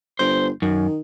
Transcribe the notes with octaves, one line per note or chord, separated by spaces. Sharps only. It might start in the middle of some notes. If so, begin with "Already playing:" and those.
G1 C5
F#2 D#3